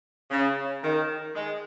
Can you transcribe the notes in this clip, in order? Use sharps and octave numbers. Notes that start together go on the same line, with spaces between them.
C#3
D#3
D#3 G#3